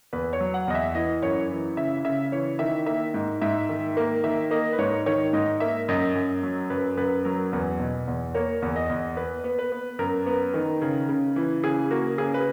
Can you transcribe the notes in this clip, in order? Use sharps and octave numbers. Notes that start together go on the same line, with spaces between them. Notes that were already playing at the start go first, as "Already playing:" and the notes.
E2 B4
C#5
F#3
F#5
E2 D#5
E5
E3 D#5
F#2 C#5
E3
C#3 E5
C#3 E5
E3 C#5
D#3 E5
A#3 E5
G#2
G#2 E5
D#3
A#3
D#3 E5
A#3 D#5
B4
G#2 C#5
D#3 C#5
G#2 D#5
A#3 E5
F#2 D#5
F#2
F#3
F#2 B4
F#2 B4
F#3 A#4
E2 B4
B2
E2
A#3 C#5
E2
D#5
E2
B3 B4
B3
B4
B3
F#2 A#4
B3
D#3
C#3
C#3
E3
C#3 G#4
A#3 F#4
C#3 G#4
B4